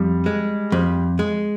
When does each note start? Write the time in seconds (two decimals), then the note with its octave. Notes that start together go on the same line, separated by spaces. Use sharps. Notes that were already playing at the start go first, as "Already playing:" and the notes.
Already playing: F2 G3
0.26 G#3
0.72 F2
1.19 G#3